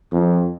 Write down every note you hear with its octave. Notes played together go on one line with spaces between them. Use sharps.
F2